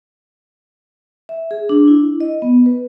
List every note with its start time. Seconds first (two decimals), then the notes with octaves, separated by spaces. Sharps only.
1.29 E5
1.51 G#4
1.69 D4
1.88 E4
2.20 D#5
2.42 B3
2.66 B4